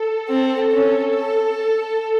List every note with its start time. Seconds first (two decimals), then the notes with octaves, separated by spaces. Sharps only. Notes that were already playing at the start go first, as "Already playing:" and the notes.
Already playing: A4
0.29 C4
0.72 C#4
1.15 A4